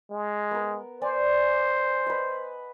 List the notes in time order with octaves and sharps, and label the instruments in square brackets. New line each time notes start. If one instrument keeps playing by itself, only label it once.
[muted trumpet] G#3
[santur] B3 A#4
[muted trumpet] C5 [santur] D5 G#5
[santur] B4 D#5